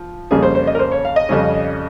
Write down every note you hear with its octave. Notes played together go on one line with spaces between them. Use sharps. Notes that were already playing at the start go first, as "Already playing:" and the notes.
Already playing: F3
F2 C#3 G3 A#3 G#4
C5
C5
D#5
A#4
C5
C#5
F5
D#5
F2 C#3 G3 C#4